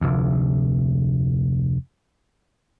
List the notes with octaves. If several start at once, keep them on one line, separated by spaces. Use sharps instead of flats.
F1 D2